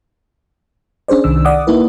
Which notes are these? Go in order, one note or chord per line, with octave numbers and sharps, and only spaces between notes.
C#4 D4 G#4 C5 D5
C2 D#3 E6
D5 F#5 D6 D#6
A#3 D#4 E4 B4